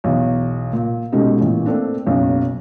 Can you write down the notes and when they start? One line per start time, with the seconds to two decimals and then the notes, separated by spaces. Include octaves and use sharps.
0.04 B1 E2
0.73 A#2
1.12 B2 G#3 A3 C#4 D#4 G4
1.41 A1 A#2
1.66 A3 A#3 C4 D4
2.06 F#1 B1 C#3